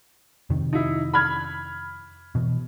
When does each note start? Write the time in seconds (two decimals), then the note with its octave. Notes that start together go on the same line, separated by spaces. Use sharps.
0.50 F2 C3 D#3
0.73 D#4 E4
1.13 B5 F6 G#6
2.35 B2 E3